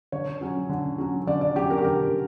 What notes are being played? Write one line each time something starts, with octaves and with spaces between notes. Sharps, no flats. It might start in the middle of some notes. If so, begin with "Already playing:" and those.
D3 C#5
F#3 C#4
D3
F#3 C#4
D3 D5
D5
F#3 C#4 G4
A#4
G4
D3 A#4